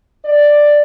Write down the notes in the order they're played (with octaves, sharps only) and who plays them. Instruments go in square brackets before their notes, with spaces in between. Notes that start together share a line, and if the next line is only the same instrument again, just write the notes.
[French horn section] D5